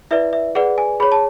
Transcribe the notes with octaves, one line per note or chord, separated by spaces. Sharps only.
E4 B4 D5 E5
E5
G#4 B4 D5 F#5
G#5
G#4 C#5 B5
A5